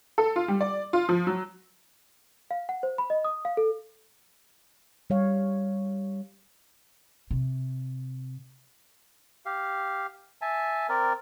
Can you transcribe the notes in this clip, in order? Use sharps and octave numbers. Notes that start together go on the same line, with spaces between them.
A4
F4
G3
D5
F4
F3
F#3
F5
F#5
C5
B5
D#5
D#6
F5
A4
G3 C#5 F5
C3
G4 F5
E5 G#5 A5
C4 A#4 D5